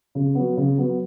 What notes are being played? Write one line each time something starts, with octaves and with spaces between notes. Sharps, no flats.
C#3
F#3 B3
C#3
F#3 B3